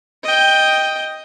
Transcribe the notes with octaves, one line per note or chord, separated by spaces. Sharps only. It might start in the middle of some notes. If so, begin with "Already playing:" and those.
D#5 G5